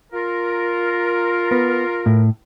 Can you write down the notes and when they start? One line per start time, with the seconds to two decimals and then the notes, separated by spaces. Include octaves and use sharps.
0.12 F4 A#4
1.52 B3
2.06 A2